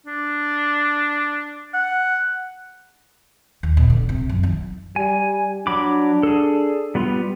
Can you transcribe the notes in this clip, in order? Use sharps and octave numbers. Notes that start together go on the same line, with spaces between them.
D4
F#5
D#2
B2
D3
C3
F#2
D#3
G3 G#5
F#3 D4 B5 D6
G#4 A4
G3 B3 F4